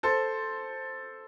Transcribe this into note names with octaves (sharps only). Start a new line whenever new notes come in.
A4 C5